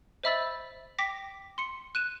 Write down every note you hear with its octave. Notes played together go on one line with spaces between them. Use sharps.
C5 D#5 E5 B5 E6 A6
G5 D6 A#6 B6
C6 C#7
F#6 D#7 E7